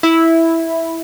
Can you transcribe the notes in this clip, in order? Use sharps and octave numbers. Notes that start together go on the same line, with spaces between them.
E4